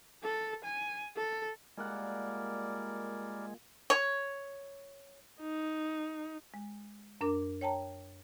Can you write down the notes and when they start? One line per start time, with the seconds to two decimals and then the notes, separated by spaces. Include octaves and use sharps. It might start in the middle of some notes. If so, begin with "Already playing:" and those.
0.24 A4
0.64 G#5
1.17 A4
1.77 A#2 G3 G#3 A#4 D5 F#5
3.90 C#5
5.40 D#4
6.54 G#3
7.21 F#2 D4 A#4 D6
7.61 C#5 G5 A5 A#5